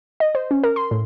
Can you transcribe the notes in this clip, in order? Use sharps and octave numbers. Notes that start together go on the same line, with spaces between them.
D#5
C5
C#4
A#4
C6
A2